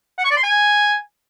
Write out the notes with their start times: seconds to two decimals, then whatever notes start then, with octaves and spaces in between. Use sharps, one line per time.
0.18 F#5
0.25 C#6
0.31 D5
0.37 C6
0.43 G#5